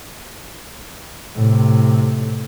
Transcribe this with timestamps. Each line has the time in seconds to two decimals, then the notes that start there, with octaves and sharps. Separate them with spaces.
1.35 A2 C3